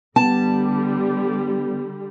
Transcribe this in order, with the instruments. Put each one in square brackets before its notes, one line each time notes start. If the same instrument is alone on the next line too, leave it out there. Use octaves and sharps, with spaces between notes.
[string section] D3 G3 [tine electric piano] B3 [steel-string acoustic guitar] A5